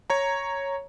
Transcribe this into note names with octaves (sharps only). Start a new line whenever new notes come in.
C#5 A#5